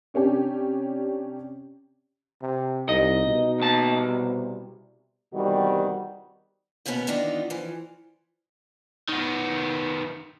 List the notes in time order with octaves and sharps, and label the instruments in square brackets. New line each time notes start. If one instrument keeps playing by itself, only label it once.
[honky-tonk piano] C3 C#4 D4 G4
[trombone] C3
[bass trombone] C2 [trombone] D#4 [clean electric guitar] D#5
[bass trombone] B2
[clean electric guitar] D#2 A5
C2
[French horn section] E2 C3 D#3 G3 F#4
[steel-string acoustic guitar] D#2 B2 B3 C#4 F#4 B4
D#3 E3 B3 D4 D#4 F4
E3 F3
[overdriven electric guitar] D#3 B3